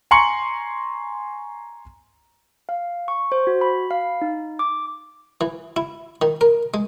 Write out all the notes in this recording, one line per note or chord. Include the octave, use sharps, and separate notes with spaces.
G#5 A#5 C6 C#6 C#7 F#7
F5
C#6
C5
F#4
B5
F5
D#4
D6
E3
E4
D#3
A#4
G#3